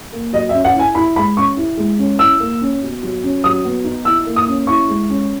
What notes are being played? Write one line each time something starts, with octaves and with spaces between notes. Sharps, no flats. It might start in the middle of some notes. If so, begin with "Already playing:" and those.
A#3
F#3 D#5
E5
C#4
F#5
E4
G#5
E4 B5
G#3 B5
C#4 C#6
E4
G#3
C#4
E4 E6
A#3
C#4
B2
F#3
C#4
F#3 D#6
B3
D#4
E4 E6
A#3
D#6
C#4
E4 C#6
G#3
C#4